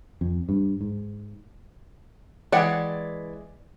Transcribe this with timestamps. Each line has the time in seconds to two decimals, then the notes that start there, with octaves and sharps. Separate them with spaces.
0.21 F2
0.49 G2
0.81 G#2
2.52 E3 G#3 D5 F#5